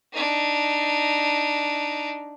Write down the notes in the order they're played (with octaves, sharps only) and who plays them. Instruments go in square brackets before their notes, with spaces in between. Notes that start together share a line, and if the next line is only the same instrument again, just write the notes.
[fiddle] D4 D#4